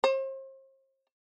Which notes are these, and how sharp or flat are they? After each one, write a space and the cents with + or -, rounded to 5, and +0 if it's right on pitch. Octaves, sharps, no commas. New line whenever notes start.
C5 +40